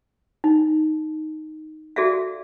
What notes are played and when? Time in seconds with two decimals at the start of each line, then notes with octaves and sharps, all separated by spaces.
0.44 D#4
1.96 F#4 G#4 A4 D5 E5 F5